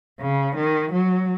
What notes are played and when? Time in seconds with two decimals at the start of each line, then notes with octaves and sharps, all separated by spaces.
0.20 C#3
0.56 D#3
0.92 F#3